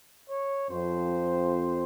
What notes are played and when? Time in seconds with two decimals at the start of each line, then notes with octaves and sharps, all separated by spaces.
0.29 C#5
0.69 F2 C5